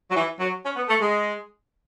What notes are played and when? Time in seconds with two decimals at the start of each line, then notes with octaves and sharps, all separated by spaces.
0.10 F#3
0.15 E3
0.40 F#3
0.64 C#4
0.76 B3
0.88 A3
1.00 G#3